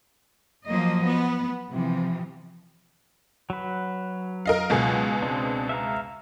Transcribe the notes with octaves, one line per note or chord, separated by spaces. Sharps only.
F3 F#3 A#3 D#5
B3
C3 E3 F3
F#3 B4
A#4 D#5 F5
C#2 B2 G#4
G#3 C4 D4
E5 F5 A#5